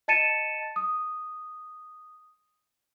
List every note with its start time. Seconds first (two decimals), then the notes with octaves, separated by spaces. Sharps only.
0.08 D#5 A5 A6 C#7 D#7 E7
0.76 D#6